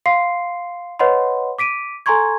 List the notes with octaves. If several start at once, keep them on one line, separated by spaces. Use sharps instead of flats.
F5 C6 C7
B4 C#5 D#5 F#5 B5 C6
D6 B6 D7 D#7
A4 G#5 A#5 C6 C#6 G#6